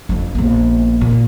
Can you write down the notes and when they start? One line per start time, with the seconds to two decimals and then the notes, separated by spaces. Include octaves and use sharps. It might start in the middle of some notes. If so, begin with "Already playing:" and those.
0.09 F2 D4
0.35 A#1 B3
1.01 A#2